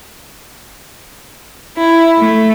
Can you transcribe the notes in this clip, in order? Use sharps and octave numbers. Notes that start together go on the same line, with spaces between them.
E4
A3